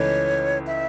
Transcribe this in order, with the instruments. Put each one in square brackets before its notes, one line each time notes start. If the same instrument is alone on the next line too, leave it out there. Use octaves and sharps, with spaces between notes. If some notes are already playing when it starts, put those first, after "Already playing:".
Already playing: [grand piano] C#2 C#3 E3 A3 D#4 [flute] C#5
[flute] E5